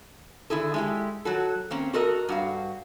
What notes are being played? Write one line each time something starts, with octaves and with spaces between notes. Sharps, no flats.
D3 E4 G#4 A4
G#3 E4 G4
F#3 F#4 A4
A#3 C4 C#4
F#4 A4 A#4 D#5
G2 F#4 F5